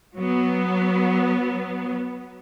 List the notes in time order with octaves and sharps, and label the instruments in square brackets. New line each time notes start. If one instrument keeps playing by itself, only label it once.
[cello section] F#3 B3